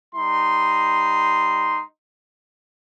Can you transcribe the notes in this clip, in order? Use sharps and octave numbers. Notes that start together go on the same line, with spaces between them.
G3 D#4 C6